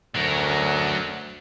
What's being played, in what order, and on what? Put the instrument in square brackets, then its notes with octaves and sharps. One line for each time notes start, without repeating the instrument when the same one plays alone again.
[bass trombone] D2 [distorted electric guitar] F#3 A#4